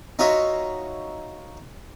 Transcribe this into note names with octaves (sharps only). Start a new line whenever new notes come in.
D#4 F4 F#4 C#5 E5